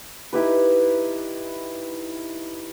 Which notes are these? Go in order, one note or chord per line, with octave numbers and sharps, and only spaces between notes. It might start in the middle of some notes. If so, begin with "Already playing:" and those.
D#4 E4 G4 B4